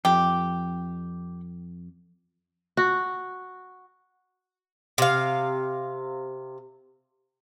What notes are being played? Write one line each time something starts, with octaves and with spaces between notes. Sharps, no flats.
F2 G4
F#4
C3 F5